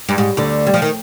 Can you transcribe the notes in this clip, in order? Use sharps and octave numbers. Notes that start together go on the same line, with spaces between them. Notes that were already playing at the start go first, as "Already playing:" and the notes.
G2
G#2
D2 D3
G3
F3
D#3